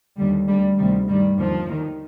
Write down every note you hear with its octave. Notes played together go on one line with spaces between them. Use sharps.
D#2 D3 G3
D2 D3 G3
D2 C3 D#3 G3
G2 D#3 G3
D#2 D3 F3
D#2 D#3